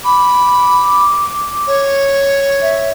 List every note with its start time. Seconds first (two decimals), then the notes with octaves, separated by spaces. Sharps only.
0.04 B5 D6
1.67 C#5
2.62 E5